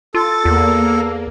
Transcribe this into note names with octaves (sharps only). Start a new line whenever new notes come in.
F4 A4 A6
E2 A#3